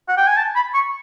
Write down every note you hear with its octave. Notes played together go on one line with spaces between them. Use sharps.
F#5
G5
G#5
A5
B5
C#6